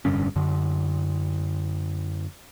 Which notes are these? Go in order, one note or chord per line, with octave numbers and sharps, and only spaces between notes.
F1 G2 D3 C#4
F#2 D3